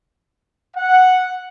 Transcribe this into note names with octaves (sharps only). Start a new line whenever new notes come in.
F#5